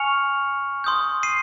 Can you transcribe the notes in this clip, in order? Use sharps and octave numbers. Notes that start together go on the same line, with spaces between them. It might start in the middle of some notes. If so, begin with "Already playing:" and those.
Already playing: G#5 C#6 F6 C#7 F7
C6 D#6 G6
C7 D#7